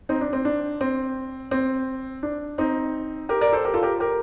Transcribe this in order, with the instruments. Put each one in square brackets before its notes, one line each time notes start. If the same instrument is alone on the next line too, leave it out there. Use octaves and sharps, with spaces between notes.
[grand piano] C4 D#4
D4
C4
D4
C4
C4
D4
C4 D#4
G4 A#4
A#4 D5
A4 C5
G4 A#4
F4 A4
G4 A#4
G4 A#4